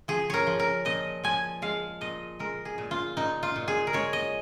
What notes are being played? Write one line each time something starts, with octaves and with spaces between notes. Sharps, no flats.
F3 G#4
A#4 C#5
F3
A#4
A#2 D#5
F3 G#5
G#3 F5
A#2 D#5
G#3 A#4
G#4
A#2
F4
A#2 D#4
F4
A#2
G#4
A#4
G#3 C#5
D#5